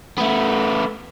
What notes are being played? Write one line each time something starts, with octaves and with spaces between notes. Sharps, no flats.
A3 B3